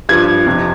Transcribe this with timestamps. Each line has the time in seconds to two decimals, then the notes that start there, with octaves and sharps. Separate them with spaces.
0.09 G2 F3 G#6
0.47 F2 C3 F3